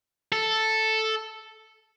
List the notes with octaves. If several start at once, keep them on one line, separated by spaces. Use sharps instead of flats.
A4